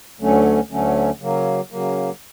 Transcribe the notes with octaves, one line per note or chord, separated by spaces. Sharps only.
D2 D3 F#3 A3 C#4
D2 D3 F#3 A3 C#4
C#3 F#3 A#3
C#3 F#3 A#3